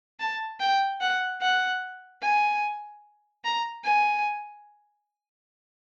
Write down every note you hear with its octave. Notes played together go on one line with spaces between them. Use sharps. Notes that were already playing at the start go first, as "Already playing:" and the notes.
A5
G5
F#5
F#5
G#5
A#5
G#5